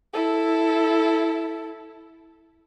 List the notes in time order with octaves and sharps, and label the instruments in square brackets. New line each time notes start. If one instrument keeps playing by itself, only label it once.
[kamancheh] E4 A4